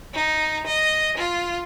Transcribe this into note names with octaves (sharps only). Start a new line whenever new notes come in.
D#4
D#5
F4